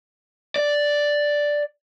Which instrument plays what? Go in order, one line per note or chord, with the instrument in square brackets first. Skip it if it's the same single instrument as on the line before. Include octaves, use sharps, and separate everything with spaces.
[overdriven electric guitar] D5